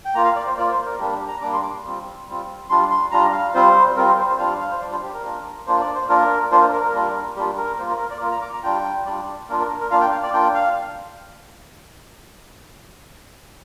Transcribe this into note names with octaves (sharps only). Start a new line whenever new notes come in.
G5
A#3 F4 A#5
F5
D5
C5
A#3 F4 D5
C5
A#4
G3 A#3 D4 G4
G4
A#5
G3 A#3 D4 D6
C6
D6
G3 C4 F4
G3 C4 F4
G3 D4 F4 C6
C6
G3 D4 F4 A#5
F5
G3 C4 F4 C5
G3 C4 F4 A#4
C5
C5
C5
G3 D4 F4 F5
F5
C5
G3 D4 F4 D5
C5
G4
A#4
A#3 D4 F4
A#3 D4 F4 C5
D5
C5
A#3 D4 F4 A#4
A#3 D4 F4 C5
A#4
A#4
A#4
G3 A#3 D4 F4
G3 A#3 D4 F4 G4
A#4
A#3 F4 C5
A#4
A#4
D5
A#3 F4 A#4
A#5
D6
A#5
G3 D4 F4 G5
G3 D4 F4 D5
A#3 D4 F4 A#4
A#4
A#4
A#3 D4 F4 F5
G5
F5
D5
A#3 D4 F4 G5
F5